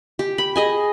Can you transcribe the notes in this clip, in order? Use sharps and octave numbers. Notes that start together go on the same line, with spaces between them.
G4
B5
G#4 D#5 G#5